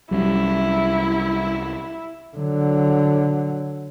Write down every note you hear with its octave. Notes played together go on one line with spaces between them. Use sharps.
C2 F#3 G3 C#4 E4
D3 F#3